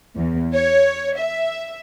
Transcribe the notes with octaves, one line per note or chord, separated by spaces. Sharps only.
E2
C#5
E5